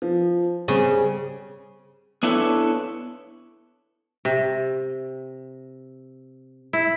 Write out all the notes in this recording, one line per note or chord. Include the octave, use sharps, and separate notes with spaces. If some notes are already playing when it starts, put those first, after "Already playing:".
F3
C#3 G3 C4
B3 D4 E4 A4 B4 C#5
C3
E4